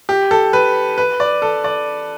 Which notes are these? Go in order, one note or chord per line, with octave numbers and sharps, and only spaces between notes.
G4
A4
B4
B4
D5
A4
D5